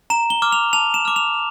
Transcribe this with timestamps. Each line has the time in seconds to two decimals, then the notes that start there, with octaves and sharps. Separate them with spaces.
0.10 A#5 E7
0.30 G7
0.42 D6 F6
0.52 F7
0.73 A5 F7
0.94 E7
1.05 D6 F6
1.16 F7